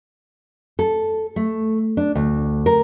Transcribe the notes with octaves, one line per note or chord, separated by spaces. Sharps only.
A4
A3
D4
D2
A#4